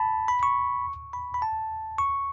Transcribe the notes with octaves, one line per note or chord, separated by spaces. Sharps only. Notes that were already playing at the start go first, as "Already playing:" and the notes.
Already playing: A5 B5
B5
C#6
B5
B5
A5
C#6